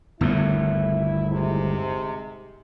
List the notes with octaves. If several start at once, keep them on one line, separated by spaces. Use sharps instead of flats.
G1 D#2 A2 E4
G#2 C3 G#3